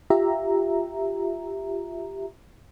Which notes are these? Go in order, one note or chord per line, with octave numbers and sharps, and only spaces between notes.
F4 G4 E5 A#5